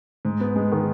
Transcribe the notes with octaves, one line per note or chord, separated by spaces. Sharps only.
G#2
B3
G#3
D#3